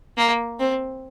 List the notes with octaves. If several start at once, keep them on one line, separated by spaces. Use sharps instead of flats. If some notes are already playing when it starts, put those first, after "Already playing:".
A#3
C4